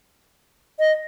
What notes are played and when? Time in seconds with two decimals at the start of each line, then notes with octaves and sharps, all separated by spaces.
0.79 D#5